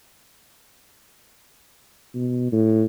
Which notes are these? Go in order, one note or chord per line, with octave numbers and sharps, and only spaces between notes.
B2
A2